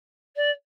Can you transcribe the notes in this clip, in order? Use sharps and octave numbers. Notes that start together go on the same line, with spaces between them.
D5